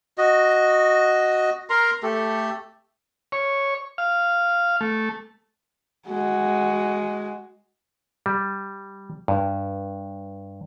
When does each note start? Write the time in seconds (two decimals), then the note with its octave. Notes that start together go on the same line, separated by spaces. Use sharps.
0.18 F#4 D#5
1.70 A#4 A#5 C6
2.03 A3 G4 A4
3.32 C#5
3.98 F5
4.81 A3
6.08 G#3 F#4
8.26 G3
9.28 G2